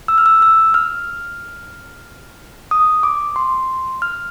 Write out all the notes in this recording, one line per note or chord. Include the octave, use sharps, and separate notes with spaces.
E6
F6
E6
E6
F6
D#6
D6
C6
F6